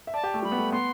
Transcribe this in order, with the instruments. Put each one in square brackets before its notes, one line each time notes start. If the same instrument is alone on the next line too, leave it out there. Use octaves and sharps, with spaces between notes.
[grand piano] E5
[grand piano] D5 [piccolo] A5
[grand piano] G4
A3
[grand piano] G3 [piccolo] B5
[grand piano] B3
A3
[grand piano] B3 [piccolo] C6